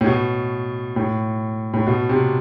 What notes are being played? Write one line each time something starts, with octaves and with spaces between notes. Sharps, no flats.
A2
B2
A2
A2
B2
C3